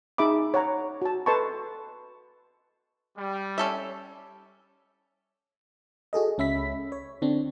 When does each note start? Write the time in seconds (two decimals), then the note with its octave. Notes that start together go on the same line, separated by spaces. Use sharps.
0.18 D#4 G#4 E5 B5 D6
0.54 C#5 F#5 A#5
1.02 F#4 A5
1.26 A4 B4 D#5 A5 C6 C#6
3.17 G3
3.58 C#4 A4 E5
6.13 F#4 G#4 A4 D#5
6.38 C#2 C#4 E5 B5 B6
6.92 C#5
7.22 D3 C4 D4